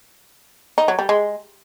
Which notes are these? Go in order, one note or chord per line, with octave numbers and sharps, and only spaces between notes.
D#4
F#3
G3
G#3